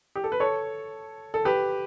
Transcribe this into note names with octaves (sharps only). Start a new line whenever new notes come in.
G4
A4
B4
A4 C#5
A4
G4 B4